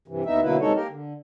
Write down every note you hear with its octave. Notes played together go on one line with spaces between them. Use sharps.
G2 C3 E3
D#2 B3 D#4 E5
B2 D3 F#3 A#3 E4 B4
G2 C3 G#3 D#4 A4 C#5
A#3 G4 A#4
D3